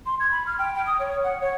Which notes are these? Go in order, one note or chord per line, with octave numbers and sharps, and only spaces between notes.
C6
G#6
B5
F6
G5
G5
D#6
C#5
F#5
C#5